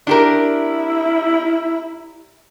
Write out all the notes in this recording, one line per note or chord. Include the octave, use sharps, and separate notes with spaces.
D4 E4 G4 A#4